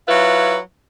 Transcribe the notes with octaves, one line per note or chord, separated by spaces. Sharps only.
F#3 E4 F4 B4